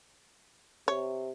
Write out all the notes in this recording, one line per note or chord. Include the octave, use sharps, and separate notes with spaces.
C3 C#5